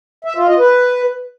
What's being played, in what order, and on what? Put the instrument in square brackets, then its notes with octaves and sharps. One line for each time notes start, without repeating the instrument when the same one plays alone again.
[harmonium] E5
F4
D#5
B4